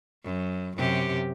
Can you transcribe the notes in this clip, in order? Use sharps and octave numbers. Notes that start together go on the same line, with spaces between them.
F#2
F#2 C3 G4